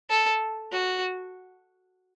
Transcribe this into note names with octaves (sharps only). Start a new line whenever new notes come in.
A4
F#4